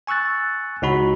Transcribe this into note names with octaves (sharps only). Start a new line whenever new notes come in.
G#5 C#6 E6 F#6 A6
C#2 D#4 F#4 B5